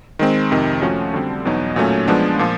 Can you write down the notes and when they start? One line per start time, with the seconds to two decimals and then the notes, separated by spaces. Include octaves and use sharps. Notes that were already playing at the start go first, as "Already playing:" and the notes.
0.19 D#3 G#3 C4
0.51 F2 C3 D#3
0.82 F3 A3 C#4 F#4
1.14 D3 G3 C4
1.45 E2 B2 F#3 B3 D#4
1.76 A#2 F#3 A3 C#4
2.08 F3 G#3 B3 D4
2.39 A#2 F3